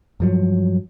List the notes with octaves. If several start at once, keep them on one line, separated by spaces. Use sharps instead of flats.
G2 F3 F#3